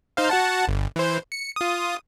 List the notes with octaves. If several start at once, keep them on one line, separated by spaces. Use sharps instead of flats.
D#4 C5 F5
F#4 F#5 A5
G1
E3 C5
C#7
F4 D#6